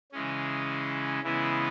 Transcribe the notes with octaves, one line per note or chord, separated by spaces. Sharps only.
C#3 E3 G#3 C#4
C#3 E3 G#3 B3 E4